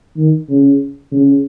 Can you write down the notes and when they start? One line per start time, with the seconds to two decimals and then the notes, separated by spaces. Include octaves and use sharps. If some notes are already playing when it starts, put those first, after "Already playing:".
0.17 D#3
0.49 C#3
1.12 C#3